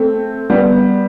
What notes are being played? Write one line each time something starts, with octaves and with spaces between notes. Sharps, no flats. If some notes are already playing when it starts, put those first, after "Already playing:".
Already playing: A3 C4
G3 B3